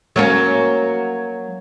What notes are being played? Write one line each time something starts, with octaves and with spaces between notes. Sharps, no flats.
F#3 A#3 C#4